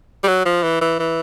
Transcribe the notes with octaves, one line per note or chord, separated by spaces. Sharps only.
G3
F#3
F3
E3
E3
E3